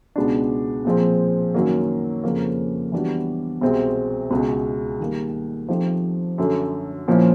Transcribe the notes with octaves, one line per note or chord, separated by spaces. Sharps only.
C#2 B2 G#3 B3 D4
A#2 F3 G#3 C4
F#2 D#3 F#3 A#3
F2 C#3 F3 A#3
E3 G3 B3 D4 F#4
C2 B2 G#3 C4
C#2 B2 G#3
D#3 G3 A#3
F3 A3 C4 D#4 G4
F#2 D3 F#3 A3
A#2 F3 A#3 C#4 E4